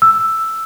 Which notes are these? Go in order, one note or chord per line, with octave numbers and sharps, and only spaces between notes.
E6